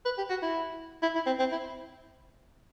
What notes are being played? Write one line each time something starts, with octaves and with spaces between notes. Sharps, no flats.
B4
G4
F#4
E4
E4
E4
C4
C4
E4